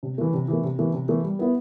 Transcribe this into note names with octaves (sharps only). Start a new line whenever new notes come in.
C3
E3 A3
C3
E3 A3
C3
E3 A3
C3
E3 A3
G3
B3 E4